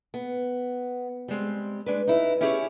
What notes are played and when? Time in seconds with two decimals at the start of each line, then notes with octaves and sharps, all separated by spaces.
0.14 B3
1.28 G3 G#3 C4
1.86 G#3 D4 B4
2.07 D#4 E4 B4
2.41 C#4 E4 G4 G#4 C5 C#5